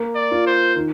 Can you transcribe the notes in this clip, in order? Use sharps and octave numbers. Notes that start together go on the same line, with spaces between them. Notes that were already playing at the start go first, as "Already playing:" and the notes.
Already playing: A#3
D5
F4
C5
D#3